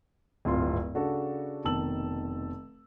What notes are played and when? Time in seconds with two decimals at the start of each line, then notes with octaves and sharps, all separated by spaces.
0.45 D1 G#1 G2 F4 C6
0.95 C#3 D4 F#4 A4
1.65 F1 B2 D#3 A5 E6 F#7